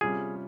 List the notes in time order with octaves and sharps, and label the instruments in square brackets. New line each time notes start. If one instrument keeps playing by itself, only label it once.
[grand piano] C3 G3 C#4 F4 [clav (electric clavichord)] G#4